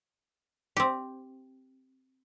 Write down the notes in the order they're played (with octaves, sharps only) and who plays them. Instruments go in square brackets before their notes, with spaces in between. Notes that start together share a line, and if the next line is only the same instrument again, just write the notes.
[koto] C4 G4